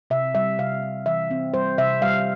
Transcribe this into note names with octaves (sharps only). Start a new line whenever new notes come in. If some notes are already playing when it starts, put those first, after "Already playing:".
C3 E5
G3 E5
C3 F5
C4
E3 E5
C4
G3 C5
C3 E5
G3 F5